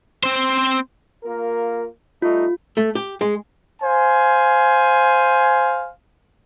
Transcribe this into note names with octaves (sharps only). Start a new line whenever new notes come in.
C4 C5
A#3 F4 A#4
G3 A3 D#4 F4
A3
G4
G#3
C5 F5 G#5